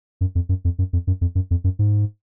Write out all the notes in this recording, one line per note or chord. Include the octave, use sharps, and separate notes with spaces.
F#2
F2
F#2
F2
F#2
F2
F#2
F2
F#2
F2
F#2
G#2